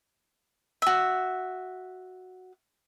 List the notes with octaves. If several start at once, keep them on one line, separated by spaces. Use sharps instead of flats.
F#4 E5